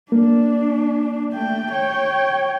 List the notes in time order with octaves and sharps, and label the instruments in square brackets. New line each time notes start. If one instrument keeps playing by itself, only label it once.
[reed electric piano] A#3 [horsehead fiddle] D4
[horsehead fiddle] A3 G5
C#5 G5